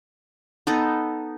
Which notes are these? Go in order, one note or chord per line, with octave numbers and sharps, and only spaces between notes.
B3 D#4 A4